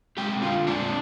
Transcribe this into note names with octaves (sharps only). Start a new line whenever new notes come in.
G#3 C4 G4 G5
D3 F4 F5
G#3 C4 D4 D5